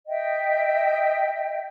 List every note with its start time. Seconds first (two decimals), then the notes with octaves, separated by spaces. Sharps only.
0.07 D#5 E5 G5